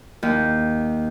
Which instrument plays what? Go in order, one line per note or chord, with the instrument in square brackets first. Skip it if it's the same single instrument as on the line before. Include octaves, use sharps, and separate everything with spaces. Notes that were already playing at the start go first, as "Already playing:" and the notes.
[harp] D#2